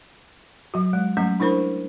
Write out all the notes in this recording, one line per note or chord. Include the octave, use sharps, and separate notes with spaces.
F#3 F#4
G#3
F#3 G3 A3 C#4
D4 E4 A#4 C5 B5